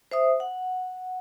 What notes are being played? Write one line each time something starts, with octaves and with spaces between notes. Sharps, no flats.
C5 E5 D#6
F#5